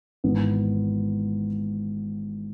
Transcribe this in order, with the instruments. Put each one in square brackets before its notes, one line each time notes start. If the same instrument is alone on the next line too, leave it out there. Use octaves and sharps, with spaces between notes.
[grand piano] G#1 G#2 E3 B3